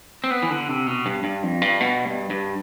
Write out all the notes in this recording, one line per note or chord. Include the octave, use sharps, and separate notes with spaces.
C4
B3
E3
D3
C3
B2
G2
G2
F2
G2
B2
G2
G2